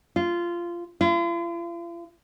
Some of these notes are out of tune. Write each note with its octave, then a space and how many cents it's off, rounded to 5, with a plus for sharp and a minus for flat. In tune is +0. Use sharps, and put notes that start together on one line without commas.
F4 -15
F4 -45